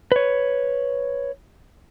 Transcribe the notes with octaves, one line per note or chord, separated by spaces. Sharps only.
B4 C#5